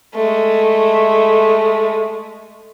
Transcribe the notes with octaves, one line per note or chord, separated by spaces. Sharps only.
G#3 A3